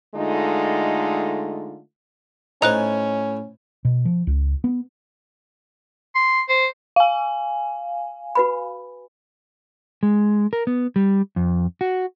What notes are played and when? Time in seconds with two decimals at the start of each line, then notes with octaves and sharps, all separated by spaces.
0.15 D3 G#3 A3 D#4 F4
2.62 A2 C#4 D#4 C5 G#5 F#6 F7
3.85 B2
4.05 F3
4.27 C#2
4.64 B3
6.15 C6
6.49 C5
6.96 F5 G#5
8.35 F#4 B4 B5
10.03 G#3
10.53 A#4
10.67 B3
10.96 G3
11.36 F2
11.81 F#4